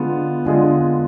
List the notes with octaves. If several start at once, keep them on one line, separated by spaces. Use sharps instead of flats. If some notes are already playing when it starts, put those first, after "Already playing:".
Already playing: D3 G#3 B3 F4
D3 G#3 B3 F4 G#4